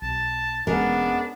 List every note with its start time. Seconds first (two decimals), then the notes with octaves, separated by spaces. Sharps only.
0.02 B1 A5
0.67 E1 G#3 A#3 B3 C#4 D4 A#4